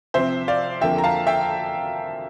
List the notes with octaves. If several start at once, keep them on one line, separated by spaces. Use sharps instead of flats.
C3 F3 C4 C5 E5
D5 F5
F2 D3 F3 A#3 E5 G5
A#5
F5 A5
E5 G5